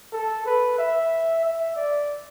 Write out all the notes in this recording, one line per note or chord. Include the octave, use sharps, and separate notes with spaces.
A4
B4
E5
E5
D5